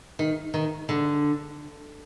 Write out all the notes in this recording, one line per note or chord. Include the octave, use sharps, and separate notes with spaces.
D#3
D#3
D3